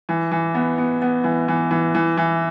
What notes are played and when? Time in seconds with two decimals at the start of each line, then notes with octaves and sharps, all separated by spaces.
0.09 E3
0.32 E3
0.55 B3
0.78 B3
1.02 B3
1.24 E3
1.48 E3
1.71 E3
1.95 E3
2.17 E3